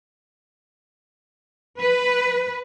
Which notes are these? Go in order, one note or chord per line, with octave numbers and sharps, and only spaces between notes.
B4